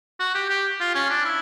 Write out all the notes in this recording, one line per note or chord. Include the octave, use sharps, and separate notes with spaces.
F#4
G4
G4
F4
C#4
D4
E4